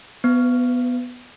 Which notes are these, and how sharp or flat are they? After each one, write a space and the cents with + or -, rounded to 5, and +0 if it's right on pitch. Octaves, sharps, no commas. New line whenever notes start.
B3 +0 B4 +45